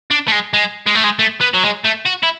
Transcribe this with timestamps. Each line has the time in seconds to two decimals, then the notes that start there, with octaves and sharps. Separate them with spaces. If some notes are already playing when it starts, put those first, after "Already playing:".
0.11 D4
0.28 A3
0.32 G#3
0.54 G#3
0.87 G#3
0.95 A3
1.04 G#3
1.19 A3
1.41 B3
1.54 F#3
1.63 G#3
1.84 A3
2.05 F#4
2.23 E4